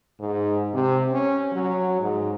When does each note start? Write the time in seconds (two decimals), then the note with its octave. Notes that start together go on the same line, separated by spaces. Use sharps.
0.19 G#2
0.74 C3
1.12 C#4
1.52 F#3
2.00 G#2